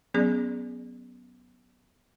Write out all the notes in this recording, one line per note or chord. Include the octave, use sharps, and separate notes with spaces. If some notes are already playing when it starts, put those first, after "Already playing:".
F#3 B3 C#4 G#4 D5